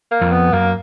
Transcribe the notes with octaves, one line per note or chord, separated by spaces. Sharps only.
A#3
F2
B3
F#2 A#3